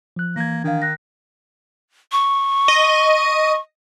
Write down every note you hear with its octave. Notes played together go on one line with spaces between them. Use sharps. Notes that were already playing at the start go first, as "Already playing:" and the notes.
F3 F#6
E3 A#3 G#6 A#6
D#3 D4 F5
F#6 A#6
C#6
D#5